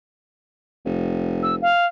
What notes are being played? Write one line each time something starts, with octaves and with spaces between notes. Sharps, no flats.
F1
E6
F5